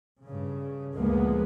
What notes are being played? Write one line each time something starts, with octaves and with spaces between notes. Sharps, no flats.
G2 C#3
D2 A#2 F3 G#3 A#3 B3